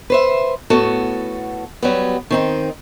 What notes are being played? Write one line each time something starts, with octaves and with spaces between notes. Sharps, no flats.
B4 C5 E5
A2 B3 F#4 A4
F#3 G3 B3
D#3 C4 D#4